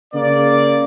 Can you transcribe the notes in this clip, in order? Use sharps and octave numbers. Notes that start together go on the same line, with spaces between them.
C#3 A#3 D5